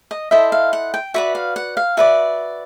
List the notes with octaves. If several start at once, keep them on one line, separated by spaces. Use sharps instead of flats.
D#5
E4 A4 C5 D#5 E5
F5
F#5
G5
F#4 B4 D5 E5
F5
F#5
F5
F#4 B4 D5 E5